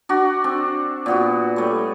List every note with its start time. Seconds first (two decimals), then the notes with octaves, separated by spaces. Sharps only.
0.09 D4 F#4
0.44 C4 D4
1.06 A#2 B3 F#4
1.56 G3 A3 C#5